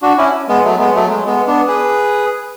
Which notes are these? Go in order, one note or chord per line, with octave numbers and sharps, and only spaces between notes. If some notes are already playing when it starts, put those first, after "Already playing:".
D4 F#4
C#4 E4
G#3 B3
F#3 A3
G#3 B3
F#3 A3
G#3
G#3 B3
B3 D4
G#4 B4